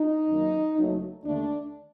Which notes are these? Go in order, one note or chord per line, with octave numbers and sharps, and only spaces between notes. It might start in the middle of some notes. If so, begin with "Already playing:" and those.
Already playing: D#4
F#2 D#3 F#3 A#3
F#1 F#2 F#3 A3
D#2 D3 A3 D4